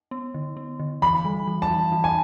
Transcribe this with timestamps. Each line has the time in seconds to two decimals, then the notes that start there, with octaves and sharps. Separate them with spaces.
0.11 B3
0.34 D3
0.57 B3
0.80 D3
1.02 E3 B5
1.25 G3
1.47 E3
1.62 A5
1.70 E3
1.92 E3
2.04 G#5